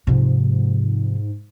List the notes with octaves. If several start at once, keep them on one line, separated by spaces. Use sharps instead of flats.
G#2 C3 F3